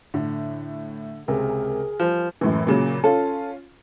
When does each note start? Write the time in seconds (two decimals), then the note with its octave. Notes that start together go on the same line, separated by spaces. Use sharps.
0.14 A2 D3
1.28 C#2 C3 G#4 A#4 G#5
2.00 F3 G3
2.41 F#2 A2 E3
2.67 A#2 C#3 F#3
3.04 C#4 F4 A4